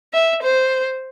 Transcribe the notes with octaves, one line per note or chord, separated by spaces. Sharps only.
E5
C5